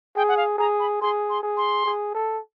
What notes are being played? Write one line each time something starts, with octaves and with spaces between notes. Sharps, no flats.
G#4 G5
F#5
F5
G#4 A#5
B5
G#4 C6
C6
G#4
C6
G#4
A4